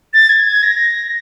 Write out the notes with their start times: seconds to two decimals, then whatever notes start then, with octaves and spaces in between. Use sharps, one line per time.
0.13 A6
0.29 G#6
0.46 G#6
0.63 A#6